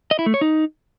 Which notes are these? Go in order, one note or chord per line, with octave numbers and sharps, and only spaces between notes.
D#5
E4
A3
C#5
D#4